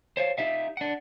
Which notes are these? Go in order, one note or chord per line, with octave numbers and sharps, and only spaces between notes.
C5 C#5 F5
D#4 G4 E5 F5
D4 F#5